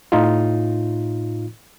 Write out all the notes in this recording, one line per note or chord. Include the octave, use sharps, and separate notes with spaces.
A2 D#4 F4